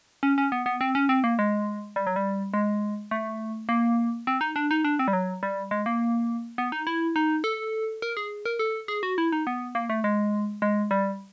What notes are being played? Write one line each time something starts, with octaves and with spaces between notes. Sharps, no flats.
C#4
C#4
B3
B3
C4
C#4
C4
A#3
G#3
G3
F#3
G3
G#3
A3
A#3
C4
D#4
D4
D#4
D4
C4
G3
F#3
G3
G#3
A#3
B3
D#4
E4
D#4
A4
A#4
G#4
A#4
A4
G#4
F#4
E4
D#4
B3
A#3
A3
G#3
G#3
G3